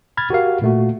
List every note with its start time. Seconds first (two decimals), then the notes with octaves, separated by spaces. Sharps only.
0.17 B5 F6 G#6 A6
0.30 F#4 G4 A#4 F5
0.62 A#2 A3 F#4